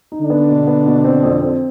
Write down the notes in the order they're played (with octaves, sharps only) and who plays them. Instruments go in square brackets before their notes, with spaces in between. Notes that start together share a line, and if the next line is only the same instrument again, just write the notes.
[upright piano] D#4
[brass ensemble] D3 D4
[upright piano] B3
B2
B3
B2
C4
F2
C4